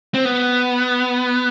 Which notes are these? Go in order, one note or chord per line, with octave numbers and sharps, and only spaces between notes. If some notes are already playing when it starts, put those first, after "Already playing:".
C4
B3